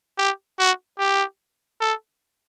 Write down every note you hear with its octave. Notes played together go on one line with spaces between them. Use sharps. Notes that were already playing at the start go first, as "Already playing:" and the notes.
G4
F#4
G4
A4